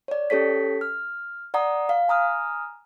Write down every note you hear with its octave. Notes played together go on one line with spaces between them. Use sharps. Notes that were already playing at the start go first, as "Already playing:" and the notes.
C#5 D5
C#4 G4 A4 C#5 B6
F6
D5 F#5 A#5 D#6
F5
G#5 A#5 D#6 F6